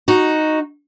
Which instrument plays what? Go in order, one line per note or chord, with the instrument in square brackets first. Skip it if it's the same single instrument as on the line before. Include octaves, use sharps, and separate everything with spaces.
[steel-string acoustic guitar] D#4 F#4